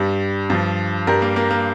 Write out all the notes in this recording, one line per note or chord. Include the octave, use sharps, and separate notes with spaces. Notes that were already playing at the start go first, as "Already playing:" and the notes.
Already playing: G2 G3
G2 F3
G2 G3 A#4
A#3
A#3
A#3